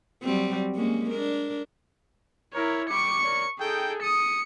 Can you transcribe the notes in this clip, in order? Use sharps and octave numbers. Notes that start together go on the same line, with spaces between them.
F#3 G3 C4
G#3 A#3 C#4
D4 A#4
E4 A#4 C#5
G3 C#6 D6 C#7
A#4 C#5 D5
D#4 G#4 A4 G5
D#6 C#7